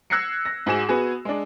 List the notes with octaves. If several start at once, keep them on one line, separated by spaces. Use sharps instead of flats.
E6 F#6 G#6 A#6 C7 C#7
A#6
G#2 F#4 G#4 E7
B3 F#4 G#4
G#3 D4